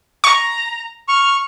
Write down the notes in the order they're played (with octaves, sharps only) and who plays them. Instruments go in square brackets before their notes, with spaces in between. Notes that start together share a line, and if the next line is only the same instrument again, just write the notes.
[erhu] A#5 [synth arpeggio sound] C#6
[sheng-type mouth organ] C#6 [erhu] F6